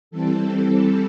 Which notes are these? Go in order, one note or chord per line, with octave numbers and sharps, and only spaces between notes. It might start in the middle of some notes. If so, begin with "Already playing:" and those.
E3 G3 C4 A4